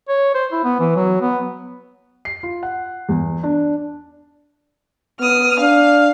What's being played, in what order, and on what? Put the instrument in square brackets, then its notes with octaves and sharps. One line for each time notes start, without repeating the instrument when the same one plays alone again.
[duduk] C#5
C5
E4
B3
E3
F#3
B3
[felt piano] C7
F4
F#5
E2
D4
[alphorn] B3 [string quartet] D#6 F6
[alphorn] D4 [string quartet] F5